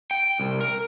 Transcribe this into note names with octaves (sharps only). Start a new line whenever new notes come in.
G5
C2
A#4